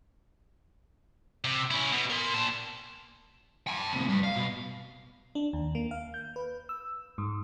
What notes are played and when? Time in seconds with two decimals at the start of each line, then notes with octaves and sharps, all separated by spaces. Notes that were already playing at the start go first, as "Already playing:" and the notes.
1.44 C3
1.71 C#4 E4
1.92 B2
2.10 A#4 C6
2.34 A#2 A5
3.67 G5 A5
3.93 A2 C3
4.09 G2
4.24 F5
4.36 B2
5.35 D4
5.53 D#2
5.75 A#3
5.91 F5
6.14 G6
6.36 B4
6.69 E6
7.18 G#2